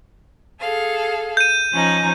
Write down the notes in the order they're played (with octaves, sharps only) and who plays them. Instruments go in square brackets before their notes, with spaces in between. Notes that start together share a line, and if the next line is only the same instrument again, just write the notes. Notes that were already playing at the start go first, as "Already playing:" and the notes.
[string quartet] G#4 A4 F5
[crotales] G6 D#7
[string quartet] F3 C#4 D#4